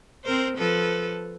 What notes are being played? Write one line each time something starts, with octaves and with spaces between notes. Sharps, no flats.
C4 A#4 C5
F3 A4 B4